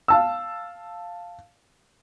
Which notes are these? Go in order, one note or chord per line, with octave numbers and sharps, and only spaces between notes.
F5 A5 E6